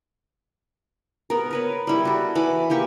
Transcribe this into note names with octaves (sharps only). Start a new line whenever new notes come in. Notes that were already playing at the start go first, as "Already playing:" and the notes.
B3 A#4
A#4 B4 C#5
G3 E4
F#4 A4
E3 F#5 B5 D6
E3 A#3 G4 C#6